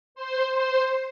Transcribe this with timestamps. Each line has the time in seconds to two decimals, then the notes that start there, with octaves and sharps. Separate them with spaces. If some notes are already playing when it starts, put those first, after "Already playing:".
0.15 C5 C6
0.53 C5 C6